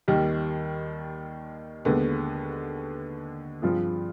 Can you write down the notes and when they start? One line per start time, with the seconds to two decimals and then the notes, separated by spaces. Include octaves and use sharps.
0.08 D#2 D#3 G3
1.85 D#2 D3 G#3 B3
3.62 G2 F3 C4 F4 G#4